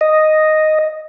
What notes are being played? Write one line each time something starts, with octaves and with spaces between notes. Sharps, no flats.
D#5